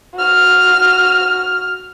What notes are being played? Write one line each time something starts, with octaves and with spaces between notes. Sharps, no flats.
F#4 F6